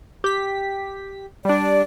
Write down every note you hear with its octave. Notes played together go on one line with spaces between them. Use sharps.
G4 B6
G3 D4 D5